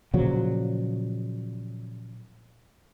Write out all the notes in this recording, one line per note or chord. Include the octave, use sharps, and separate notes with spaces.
A#2 C#3 F3 F#3